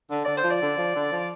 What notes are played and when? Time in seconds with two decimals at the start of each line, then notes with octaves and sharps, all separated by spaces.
0.10 D3
0.24 D3 D5
0.37 C5
0.44 F3
0.50 D5
0.61 D3
0.78 F3
0.95 D3
1.12 F3